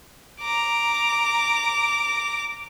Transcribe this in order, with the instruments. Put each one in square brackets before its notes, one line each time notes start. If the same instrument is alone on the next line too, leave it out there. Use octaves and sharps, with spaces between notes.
[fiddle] A#5 D6